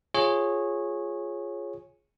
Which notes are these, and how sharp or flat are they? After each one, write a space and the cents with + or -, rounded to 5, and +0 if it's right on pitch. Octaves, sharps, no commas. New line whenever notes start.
F4 +0 G#4 +0 C#5 -15